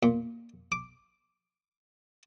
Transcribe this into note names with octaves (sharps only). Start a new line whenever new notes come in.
A#2
D6